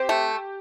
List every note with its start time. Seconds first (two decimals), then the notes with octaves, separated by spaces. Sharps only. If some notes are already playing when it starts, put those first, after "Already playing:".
Already playing: C4 G4
0.09 A3